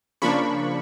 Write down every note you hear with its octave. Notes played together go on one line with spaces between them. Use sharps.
C#3 F3 A#3 D4 B5 C#6